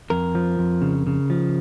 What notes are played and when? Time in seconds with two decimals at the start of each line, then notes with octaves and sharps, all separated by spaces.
0.10 F2 A#4
0.35 F3
0.59 F2
0.82 C#3
1.07 C#3
1.30 F3